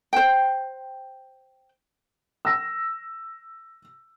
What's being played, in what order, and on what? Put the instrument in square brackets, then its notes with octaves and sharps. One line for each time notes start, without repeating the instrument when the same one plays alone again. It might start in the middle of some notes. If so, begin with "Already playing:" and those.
[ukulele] C5 G5
[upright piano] E6 A#6